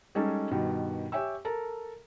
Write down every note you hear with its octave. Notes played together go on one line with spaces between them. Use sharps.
G3 G#3 C#4 D#4 G#4 A4
G2 B2 D#3
G4 C#5 E5 G5 G#5 E6
A4 A#4 A#5